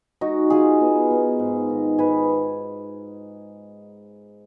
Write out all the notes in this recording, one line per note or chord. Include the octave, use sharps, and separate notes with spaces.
G#3 D#4 F#4
G#3 F4 G#4
B3
B3
G#2
D#3
G#2 G#4 B4